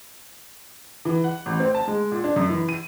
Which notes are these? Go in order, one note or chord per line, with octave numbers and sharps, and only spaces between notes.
E3
F#5
A1
C4
A5
G#3
A#2
D4
F#2
E3
D#7